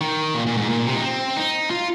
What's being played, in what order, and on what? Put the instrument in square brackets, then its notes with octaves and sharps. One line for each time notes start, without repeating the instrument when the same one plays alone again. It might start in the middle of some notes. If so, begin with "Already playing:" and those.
[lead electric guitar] D#3
A#2
A#2
G#2
A#2
C3
D#4
C4
D#4
F4